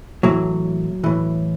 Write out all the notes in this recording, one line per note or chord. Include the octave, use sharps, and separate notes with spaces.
A2 E3 F#3
A2 E3